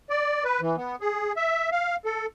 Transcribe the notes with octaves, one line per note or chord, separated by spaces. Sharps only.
D5
B4
E3
B3
G#4
E5
F5
A4